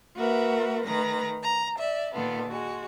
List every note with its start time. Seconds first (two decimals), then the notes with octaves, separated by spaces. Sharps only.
0.18 A#3 F#4 A#4 B4 E5
0.85 D#3 A3 B4 A#5 A#6
1.42 A#5
1.78 D5 E5
2.13 A#2 D#3 B3 F4 A4
2.46 G#3 F#4